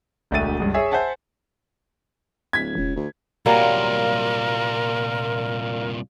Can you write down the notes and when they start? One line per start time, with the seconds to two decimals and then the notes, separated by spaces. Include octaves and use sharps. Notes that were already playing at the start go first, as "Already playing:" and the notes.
0.31 E1 D2 F#4 E5 A6 D#7
0.60 C#2 G2
0.74 G#4 C#5 E5
0.91 C5 E5 F#5 G#5 A5
2.53 D1 G#6 B6
2.75 E1 C#2
2.96 D2
3.46 C2 A#2 F#3 G3 A#3 A#4 D5 F5